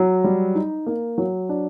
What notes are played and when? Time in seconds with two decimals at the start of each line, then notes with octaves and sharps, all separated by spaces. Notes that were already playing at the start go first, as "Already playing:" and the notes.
Already playing: F#3
0.24 G3
0.55 D#4
0.86 A#3
1.18 F#3
1.49 D4